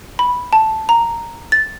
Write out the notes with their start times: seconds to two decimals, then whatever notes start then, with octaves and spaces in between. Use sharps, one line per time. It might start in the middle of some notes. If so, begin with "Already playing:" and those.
0.19 B5
0.53 A5
0.89 A#5
1.52 A6